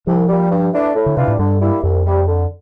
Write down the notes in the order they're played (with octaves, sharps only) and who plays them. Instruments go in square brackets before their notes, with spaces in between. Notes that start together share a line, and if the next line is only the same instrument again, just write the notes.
[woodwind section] C2 [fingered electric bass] F3
[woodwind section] A#2 G3
G2
E3 A3 D4
A2
[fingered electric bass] D3
[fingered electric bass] C3 [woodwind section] E3 G3 D4 F4
[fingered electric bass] A2
[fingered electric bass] G2 [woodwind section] D3
[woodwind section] G3 A#3 E4
[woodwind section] C2 [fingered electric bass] F2
[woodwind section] C3 G3
D3